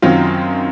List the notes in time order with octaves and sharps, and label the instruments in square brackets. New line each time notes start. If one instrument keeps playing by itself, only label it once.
[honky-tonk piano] F#2 D#3 F#3 C4 F4